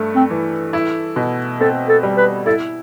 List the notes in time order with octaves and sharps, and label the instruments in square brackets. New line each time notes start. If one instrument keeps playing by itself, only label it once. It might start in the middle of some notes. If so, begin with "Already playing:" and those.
Already playing: [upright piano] G2 A3
[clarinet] C4
[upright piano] E3
E4
B2
[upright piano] C4 [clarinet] A4
[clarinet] A4
[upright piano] G3
[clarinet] B4
[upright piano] E4 [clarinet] A4